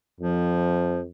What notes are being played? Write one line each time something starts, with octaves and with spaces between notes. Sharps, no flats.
F2 F3